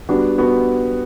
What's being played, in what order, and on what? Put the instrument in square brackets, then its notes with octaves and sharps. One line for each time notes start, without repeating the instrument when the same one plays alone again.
[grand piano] G3 B3 D4 F#4
G3 B3 D4 F#4